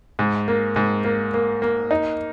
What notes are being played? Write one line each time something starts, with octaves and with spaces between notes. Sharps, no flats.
G#2
A#3
G#2
A#3
A#3
A#3
D#4